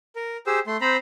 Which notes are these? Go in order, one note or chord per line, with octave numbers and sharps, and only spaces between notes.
A#4
G4 G#4 C5 E6
A3 C6
C4 C5 A#5 B5